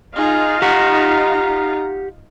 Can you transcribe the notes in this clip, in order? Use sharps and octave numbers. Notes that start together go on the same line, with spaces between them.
D#4 F4 G#4 F5
G4 F#5 A#5